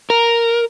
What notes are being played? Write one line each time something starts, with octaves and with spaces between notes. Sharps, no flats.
A#4